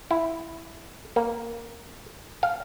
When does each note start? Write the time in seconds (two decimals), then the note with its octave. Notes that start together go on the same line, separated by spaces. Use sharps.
0.11 E4
1.16 A#3
2.43 F5